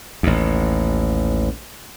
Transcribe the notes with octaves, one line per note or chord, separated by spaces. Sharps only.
A1 D#2